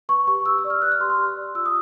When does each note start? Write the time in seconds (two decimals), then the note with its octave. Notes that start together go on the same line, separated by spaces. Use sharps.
0.09 B4 C#6
0.27 G4 C#6
0.46 G4 E6
0.58 E6
0.64 D5
0.70 F6
0.81 B4 F#6
0.92 F6
1.00 G4 C6
1.10 C6
1.18 G4
1.37 D5
1.55 F4 E6
1.66 D#6